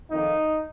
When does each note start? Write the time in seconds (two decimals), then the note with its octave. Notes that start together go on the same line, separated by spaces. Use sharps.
0.10 F2 D#3 A#3 D#4